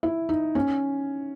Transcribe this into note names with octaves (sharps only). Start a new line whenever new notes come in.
E4
D#4
C#4